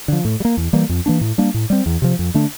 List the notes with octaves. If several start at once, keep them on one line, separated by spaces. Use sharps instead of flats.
D3 F3
A2
G3
A#3
E2
E3 G3 A#3
F2
E3 A#3 D4
A2
G3 A#3 D4
A2
G3 C4
E2
C3 F3
F2
D3 A3 D4